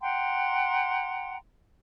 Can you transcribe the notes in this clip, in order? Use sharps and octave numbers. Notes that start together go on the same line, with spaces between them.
F#5 G5 A#5 C6